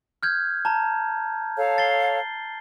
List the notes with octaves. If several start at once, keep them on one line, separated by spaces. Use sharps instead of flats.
F6 G6 G#6
A5 A#5
A4 C#5 F5
A6 C7 G7